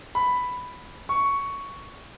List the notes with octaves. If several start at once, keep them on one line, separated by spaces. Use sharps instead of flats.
B5
C#6